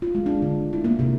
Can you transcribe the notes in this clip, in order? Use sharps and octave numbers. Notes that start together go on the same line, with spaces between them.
F4
G#3
D4
D3
E4
A#3
C3